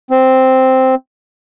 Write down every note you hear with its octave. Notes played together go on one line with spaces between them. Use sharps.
C4